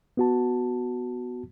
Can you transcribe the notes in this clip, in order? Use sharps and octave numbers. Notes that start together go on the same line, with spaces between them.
B3 F#4 A5